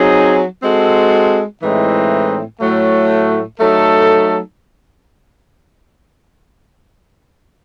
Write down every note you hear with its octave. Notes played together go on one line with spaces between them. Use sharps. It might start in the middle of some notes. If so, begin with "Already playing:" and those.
Already playing: F#3 C4 D#4 G#4
G#3 C4 F#4 A4
A2 E3 G#3 C4 D#4
A2 F#3 A3
F#3 A3 D#4 A4